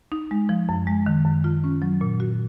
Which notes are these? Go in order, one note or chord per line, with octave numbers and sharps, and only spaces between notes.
D#4
G#3
F3
F#2
G#3
D#3
F#2
F4
C#4
F#3
A#2
F#4